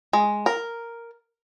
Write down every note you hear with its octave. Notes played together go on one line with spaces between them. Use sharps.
G#3
A#4